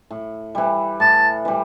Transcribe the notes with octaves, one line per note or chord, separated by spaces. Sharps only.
A2
E3 G3
A2 A5
E3 G3